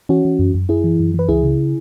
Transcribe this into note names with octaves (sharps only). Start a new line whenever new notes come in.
E3 C#4 F#4
E3
F#2
F#2
F#2 E4 G#4
E3
F#2
E3 B4
C#2 E4 G#4
C#3